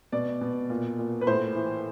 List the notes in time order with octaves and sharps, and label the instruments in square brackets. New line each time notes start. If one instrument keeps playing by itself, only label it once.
[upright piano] B2 D5
B2
A#2
A#2
B4
A2 C5
E3